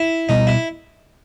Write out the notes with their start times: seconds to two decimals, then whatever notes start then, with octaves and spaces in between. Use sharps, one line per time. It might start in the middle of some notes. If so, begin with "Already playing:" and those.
Already playing: E4
0.29 B2 G3 B3 D#4
0.47 E4